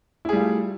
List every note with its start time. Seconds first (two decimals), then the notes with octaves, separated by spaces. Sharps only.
0.25 E4
0.29 G#4
0.33 G3
0.37 F4
0.41 A3